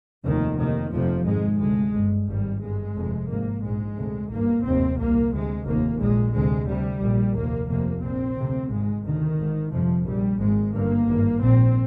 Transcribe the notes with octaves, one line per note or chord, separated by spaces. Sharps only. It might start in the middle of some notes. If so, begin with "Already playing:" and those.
F1 D#2 D#3
F1 D#2 D#3
F1 F2 C3 F3
G#1 G#2 G#3
D2 C3 G#3
G1 G2
G#1 G#2 G3
G1 G2 G#3
F1 F2 C3
G#1 G#2 A#3
A#1 G#2 G#3
D2 C3
G#1 G2 A#3
F1 D#2 C4
C2 A#2 A#3
D2 C3 G#3
F1 D#2 A#3
A#1 A#2 G#3
D2 C3 G#3
D2 C3 G3
A#1 A#2
F1 D#2 A#3
F1 F2 C3 A#3
A#1 A#2 C4
D2 C3
G#1 G#2 G#3
D2 C3 D#3
G#1 G#2
G1 F2 C3 F3
A#1 A#2 G3
G#1 G#2 G#3
G1 G2 A#3
G#1 G2
A#1 A#2 C4